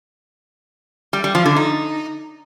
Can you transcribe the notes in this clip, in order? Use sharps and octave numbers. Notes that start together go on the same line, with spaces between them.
G3
G3
F3
D3
D#4